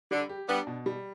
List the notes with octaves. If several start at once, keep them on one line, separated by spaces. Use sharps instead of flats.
D3 G3
G4
G3 B3 D4
B2
G3